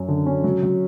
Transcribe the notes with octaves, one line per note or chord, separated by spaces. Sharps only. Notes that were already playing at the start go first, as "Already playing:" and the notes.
Already playing: F#2 F#3 C#4
D3
C#4
F#3
F#3